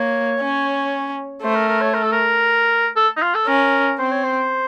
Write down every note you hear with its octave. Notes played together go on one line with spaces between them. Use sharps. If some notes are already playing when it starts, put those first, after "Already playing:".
Already playing: A#3 C#5
C#4
A3 C5
A#4
A#4
C#5
A#4
A4
A#4
A4
D#4
F4
A4
C#4 A#4
C4 C5
C#5
C5